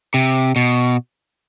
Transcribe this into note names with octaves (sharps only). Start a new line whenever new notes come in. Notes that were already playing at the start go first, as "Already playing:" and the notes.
C3
B2